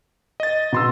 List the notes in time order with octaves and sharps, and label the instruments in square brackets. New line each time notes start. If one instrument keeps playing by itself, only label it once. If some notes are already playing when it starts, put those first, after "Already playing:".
[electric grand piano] D#5 A6
[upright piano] B2 C6 E6